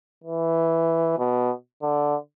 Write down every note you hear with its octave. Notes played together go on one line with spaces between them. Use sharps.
E3
B2
D3